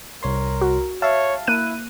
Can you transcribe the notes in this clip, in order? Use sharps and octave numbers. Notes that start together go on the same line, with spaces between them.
C2 A#4 C#5 C6
F#4
C#5 E5 F5 A5
A#3 E4 F#6 D#7